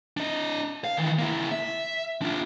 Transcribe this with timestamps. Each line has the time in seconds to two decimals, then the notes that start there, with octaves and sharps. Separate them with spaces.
0.17 D4 D#5
0.84 F5
0.97 D#3 E3
1.19 A#3 E4
1.51 E5
2.22 D4 F4